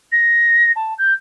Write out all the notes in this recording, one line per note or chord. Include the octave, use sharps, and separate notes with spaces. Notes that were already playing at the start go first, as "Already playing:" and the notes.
A#6
A5
G6